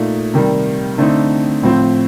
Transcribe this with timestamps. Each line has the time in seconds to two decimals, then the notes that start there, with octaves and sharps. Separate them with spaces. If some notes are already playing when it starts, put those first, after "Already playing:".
Already playing: A#2 A3 D#4
0.33 C3 D#3 G3
0.98 D3 A3 C4 D#4
1.63 A2 F3 C4